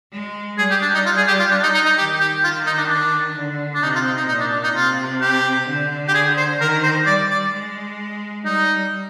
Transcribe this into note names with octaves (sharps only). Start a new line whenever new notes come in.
G#3
G3 G#4
G4
D4
D#4
F4
G#4
G4
F4
D4
D#4
D#4
D#4
D#3 G4
G4
D#3 F4
D#4
D4
D4
D3
D4
C3 D#4
F4
D#4
D#4
A#2 D#4
D4
D4
D#4
C3 F4
G4
D3
G4
G#4
C5
D#3 A#4
C5
G3 D5
D5
G#3
G3 D#4